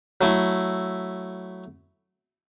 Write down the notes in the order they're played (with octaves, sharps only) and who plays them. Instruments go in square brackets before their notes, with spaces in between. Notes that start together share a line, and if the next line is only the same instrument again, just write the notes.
[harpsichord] F#3 A3 E4